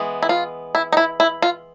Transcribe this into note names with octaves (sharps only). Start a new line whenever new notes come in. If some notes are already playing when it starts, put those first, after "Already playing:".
Already playing: E3 G#3 B3
E4
F4
E4
D#4
E4
E4
F4